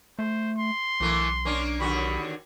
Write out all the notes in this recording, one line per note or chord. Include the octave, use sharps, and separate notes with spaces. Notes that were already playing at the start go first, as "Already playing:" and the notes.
A3 C5
C6
B1 E3 A3 A#3
A#3 C#4 D4
D#2 D3 F#4 B5